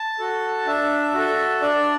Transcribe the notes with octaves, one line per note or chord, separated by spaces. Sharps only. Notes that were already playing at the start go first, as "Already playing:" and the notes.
Already playing: A5
F#4 A4
D4 E5
F#4 A4
D4 D5